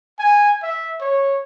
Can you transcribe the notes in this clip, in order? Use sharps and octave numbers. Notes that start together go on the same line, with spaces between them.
G#5
E5
C#5